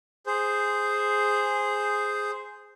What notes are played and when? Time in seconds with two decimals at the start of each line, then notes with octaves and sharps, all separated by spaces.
0.27 G#4 C5